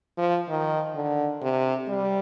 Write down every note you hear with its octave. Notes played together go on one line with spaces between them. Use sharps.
F3
D#3
D3
C3
G3